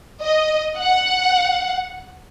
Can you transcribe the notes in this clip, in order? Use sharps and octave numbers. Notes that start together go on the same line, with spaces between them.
D#5
F#5